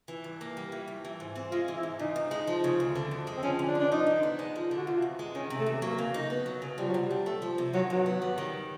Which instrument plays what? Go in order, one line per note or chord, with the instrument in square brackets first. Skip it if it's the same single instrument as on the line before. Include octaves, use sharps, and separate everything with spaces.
[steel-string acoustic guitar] E3
G2
A#3
G3
E3
G2
E3
G#2
C4
[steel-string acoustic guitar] G#3 [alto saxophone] F4
[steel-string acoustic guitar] E3
[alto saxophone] E4
[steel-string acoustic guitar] G#2
[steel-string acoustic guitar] C#3 [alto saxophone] D#4
[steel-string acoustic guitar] D2
G#3
F3
C#3
D2
D3
F2
G#3
[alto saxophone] C4
[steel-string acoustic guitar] F3 [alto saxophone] C#4
[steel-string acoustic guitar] D3
[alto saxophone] D4
[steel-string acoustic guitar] F2
[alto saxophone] D4
[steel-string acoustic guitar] F3 [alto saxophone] D#4
[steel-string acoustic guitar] D3
B3
G#3
F3
D3
[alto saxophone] F#4
[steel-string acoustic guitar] C3 [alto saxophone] F4
[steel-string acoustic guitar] E2
G#3
[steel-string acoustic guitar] D#3 [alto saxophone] C#4
[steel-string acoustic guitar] C3
[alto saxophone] A3
[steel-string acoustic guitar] E2
[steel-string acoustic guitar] F#3 [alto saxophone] A#3
[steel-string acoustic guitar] C#3
D#4
B3
F#3
C#3
[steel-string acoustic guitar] F3 [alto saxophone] G3
[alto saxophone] F#3
[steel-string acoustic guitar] C3 [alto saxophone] G3
[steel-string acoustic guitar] D4
A3
F3
C3
[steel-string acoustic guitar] D#3 [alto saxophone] F#3
[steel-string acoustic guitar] G2 [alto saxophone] F#3
[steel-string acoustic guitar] B3
G3
D#3